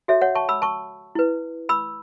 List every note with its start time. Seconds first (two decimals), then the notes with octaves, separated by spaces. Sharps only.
0.08 F#4 A4 C#5 E5
0.21 C#5 F#5
0.35 A5 C#6
0.49 B5 E6
0.62 A5 C#6
1.15 E4 B4
1.69 B5 E6